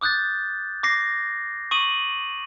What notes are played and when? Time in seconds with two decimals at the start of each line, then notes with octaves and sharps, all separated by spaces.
0.01 D6 D#6 F#6 G6 A6
0.83 D6 A#6 C7
1.71 C#6 D#6 D#7 F#7